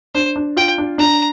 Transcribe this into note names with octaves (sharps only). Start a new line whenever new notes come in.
D4 C5
D4
F4 G5
D4
D4 A#5